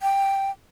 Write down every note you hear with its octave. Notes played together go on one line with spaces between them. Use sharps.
G5